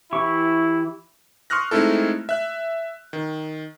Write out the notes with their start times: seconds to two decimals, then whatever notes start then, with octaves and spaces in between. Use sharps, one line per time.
0.13 E3 E4 G4 C#6
1.50 C6 C#6 D#6 F6 F#6 A#6
1.71 G#3 A3 C4 D#4 E4 A4
2.29 E5 F#6
3.13 D#3